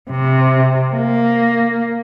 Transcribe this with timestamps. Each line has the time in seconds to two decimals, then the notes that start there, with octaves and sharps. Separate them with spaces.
0.10 C3
0.95 A#3